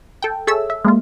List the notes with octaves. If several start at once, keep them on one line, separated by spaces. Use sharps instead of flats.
A4 G5
G#4 A4 C#5 E5 E6
E5
G#3 A#3 F4